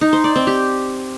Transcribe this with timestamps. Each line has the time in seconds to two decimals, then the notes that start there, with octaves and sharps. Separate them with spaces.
0.01 D#4
0.13 C5
0.24 D5
0.36 C4
0.47 G4